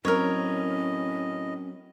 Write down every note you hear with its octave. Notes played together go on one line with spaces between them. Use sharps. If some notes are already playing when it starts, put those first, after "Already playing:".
A2 F#3 C4 C#4 A#4 C#5 D#5